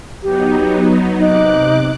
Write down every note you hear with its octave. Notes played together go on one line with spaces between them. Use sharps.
F#3 B3 D#4 G4
C3 D#4 D6 F#6